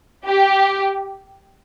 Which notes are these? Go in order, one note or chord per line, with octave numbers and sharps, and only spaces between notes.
G4